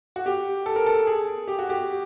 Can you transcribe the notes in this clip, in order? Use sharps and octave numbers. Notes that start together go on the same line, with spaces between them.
F#4
G4
A4
A#4
A4
G#4
G4
F#4
G4